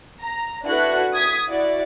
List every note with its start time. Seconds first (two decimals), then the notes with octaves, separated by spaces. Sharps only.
0.21 A#5
0.65 D4 E4 F#4 A4 B4 F#6
1.13 D#6 G#6 B6
1.48 E4 F#4 D5